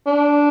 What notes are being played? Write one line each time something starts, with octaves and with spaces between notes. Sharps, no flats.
D4